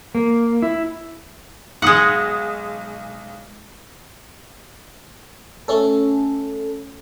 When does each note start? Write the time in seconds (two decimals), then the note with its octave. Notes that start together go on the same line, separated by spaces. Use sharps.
0.15 A#3
0.62 E4
1.82 B1 G#3 F#5 D#6
5.68 A3 C#4 A4